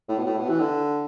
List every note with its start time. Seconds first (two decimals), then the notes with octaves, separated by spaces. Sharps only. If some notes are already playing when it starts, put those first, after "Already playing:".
0.09 A2
0.18 B2
0.26 A2
0.38 B2
0.49 E3
0.60 D3